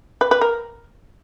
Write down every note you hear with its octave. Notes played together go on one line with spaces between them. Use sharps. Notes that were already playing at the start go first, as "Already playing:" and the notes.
B4
B4
A#4